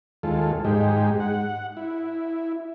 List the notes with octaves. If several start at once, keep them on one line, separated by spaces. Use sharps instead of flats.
D#2 G#3 F4 A4
G#2 G#3 D#4 G4
F#5
E4